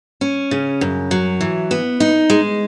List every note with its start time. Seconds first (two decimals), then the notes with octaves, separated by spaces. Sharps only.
0.21 C#4
0.51 C#3
0.81 F#2
1.11 F#3
1.41 E3
1.71 B3
2.00 D#4
2.30 G#3